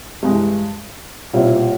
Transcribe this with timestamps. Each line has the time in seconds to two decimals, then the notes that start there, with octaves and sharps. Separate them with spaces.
0.23 G2 E3 G#3
1.33 B1 A#2 G3 C4 E4